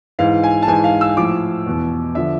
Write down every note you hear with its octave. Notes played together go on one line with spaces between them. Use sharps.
G#2 E3 F5
G#5
A5
G#2 E3 G#5
F5
E6
A2 F3 D6
E2 B2
D3 F3 E5